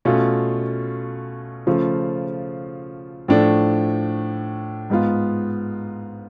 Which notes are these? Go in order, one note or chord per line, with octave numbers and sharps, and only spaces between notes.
B2 A3 C#4 F4
C#3 F3 A3 F4
A2 F3 A3 D4
G#2 G#3 B3 F4